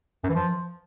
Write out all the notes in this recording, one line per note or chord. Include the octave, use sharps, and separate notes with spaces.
F#2
E3
F3